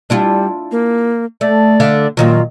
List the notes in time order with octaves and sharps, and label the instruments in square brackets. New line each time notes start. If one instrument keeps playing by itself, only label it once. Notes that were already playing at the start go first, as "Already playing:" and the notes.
[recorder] G3 [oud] D4 E4 F4
[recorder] A#3
[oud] A3 [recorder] D5
[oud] D3 E5 F5
[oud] A#2 D#3 F#3 [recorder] F4